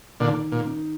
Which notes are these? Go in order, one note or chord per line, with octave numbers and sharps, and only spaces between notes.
A#2 D3 D#3
A#2
D#4